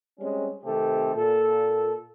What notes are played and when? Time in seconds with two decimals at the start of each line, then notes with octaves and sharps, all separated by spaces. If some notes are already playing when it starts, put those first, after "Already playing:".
0.19 G3 G#3 C4 C#4
0.64 C3 D#3 A3 C4 G4 A4
1.15 A#2 A4